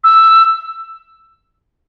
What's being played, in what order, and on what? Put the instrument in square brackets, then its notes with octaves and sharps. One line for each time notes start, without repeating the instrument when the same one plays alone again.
[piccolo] E6